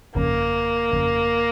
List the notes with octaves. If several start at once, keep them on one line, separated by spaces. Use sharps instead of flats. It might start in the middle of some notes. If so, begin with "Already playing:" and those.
G1 F2 C#3 A#3
G1 F2 C#3